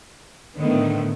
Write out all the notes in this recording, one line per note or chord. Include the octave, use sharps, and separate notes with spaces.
A2 D3 D#3 A3 B3